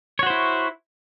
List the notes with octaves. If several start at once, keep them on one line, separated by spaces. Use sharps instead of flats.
E4 F#4 C5 C#5